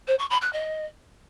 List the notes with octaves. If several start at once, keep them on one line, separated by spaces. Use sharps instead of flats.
C5
C#6
B5
F#6
D#5